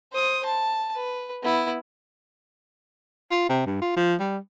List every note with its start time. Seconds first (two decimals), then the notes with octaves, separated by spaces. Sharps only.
0.12 C5 D#6
0.45 A5
0.95 B4
1.43 B3 E4
3.31 F4
3.49 C3
3.66 G2
3.82 F4
3.97 F3
4.20 G3